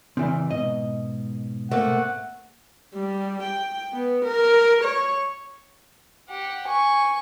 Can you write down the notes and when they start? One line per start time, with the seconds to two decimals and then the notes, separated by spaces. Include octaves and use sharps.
0.17 C#3 E3 C4 D5
0.51 G#2 B2 D#5
1.71 A3 A#3 C4 F#5
2.95 G3
3.43 G5
3.93 B3
4.25 A#4
4.84 C#5
6.29 G4 F#5
6.66 G#5 C#6